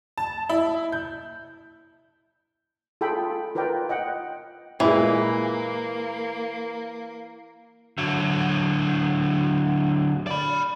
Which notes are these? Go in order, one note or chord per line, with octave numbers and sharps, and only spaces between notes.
A5
E4
G6
F4 G#4 A4 G5 B5
F4 A#4 B4 D5 G5
D#5 F#5 G5
A#2 E3 G#3 A#3
D3 F#3
D5 B5